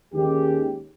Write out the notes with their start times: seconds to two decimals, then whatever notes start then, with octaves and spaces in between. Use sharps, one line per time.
0.12 D#2 D#3 G#3 C#4 G4